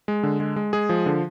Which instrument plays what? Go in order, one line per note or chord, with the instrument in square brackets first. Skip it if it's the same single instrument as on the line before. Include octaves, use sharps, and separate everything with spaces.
[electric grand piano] G#3
D3
G#3
G#3
G#3 G#4
F3
D3